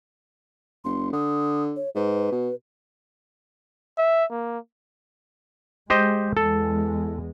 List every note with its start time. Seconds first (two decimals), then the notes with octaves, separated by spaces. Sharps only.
0.85 F#1 C6
1.13 D3 D#6
1.76 C#5
1.95 G#2 B4
2.32 B2
3.98 E5
4.31 A#3
5.90 G#3 G4 C5 D#5
6.37 E2 G#3 A4